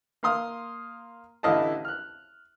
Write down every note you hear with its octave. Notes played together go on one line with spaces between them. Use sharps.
A#3 F5 C6 D#6 F6
A1 D3 E4 D#5 F5 A5
F6 F#6